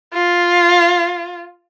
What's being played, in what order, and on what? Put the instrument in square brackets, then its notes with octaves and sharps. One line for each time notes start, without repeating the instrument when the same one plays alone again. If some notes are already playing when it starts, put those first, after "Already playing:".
[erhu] F4